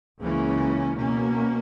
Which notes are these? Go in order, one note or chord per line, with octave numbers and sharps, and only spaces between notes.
C#2 C#3 E3 A#3 C#4
B2 A#3 C#4